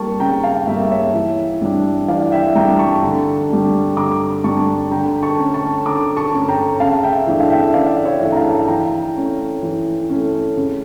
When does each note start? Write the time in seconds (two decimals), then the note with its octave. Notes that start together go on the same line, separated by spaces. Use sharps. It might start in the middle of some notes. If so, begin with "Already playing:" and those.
Already playing: G3 A#3 A5 C#6
0.20 C#3 G5 A#5
0.44 F5 A5
0.67 G3 A#3 E5 G5
0.91 C#5 E5
1.14 E3
1.62 G3 D4
2.08 E3 D5 F5
2.32 E5 G5
2.55 G3 D4 G5 A#5
2.79 A5 C#6
3.03 D3
3.50 G3 D4
3.97 D3 A#5 D6
4.44 G3 D4 A5 C#6
4.91 D3 G5 A#5
5.23 A5 C#6
5.38 A3 C#4
5.54 A5 C#6
5.85 D3 A#5 D6
6.17 A5 C#6
6.33 A3 C#4
6.48 G5 A#5
6.80 C#3 F5 A5
7.03 E5 G5
7.27 E3 A3 D4
7.40 F5
7.50 E5 G5
7.74 C#3 D5 F5
8.05 C#5 E5
8.21 E3 A3 D4
8.32 A#5
8.36 F5 A5
8.68 E3 G5 A#5
9.15 A3 C#4
9.63 E3
10.10 A3 C#4
10.57 C#3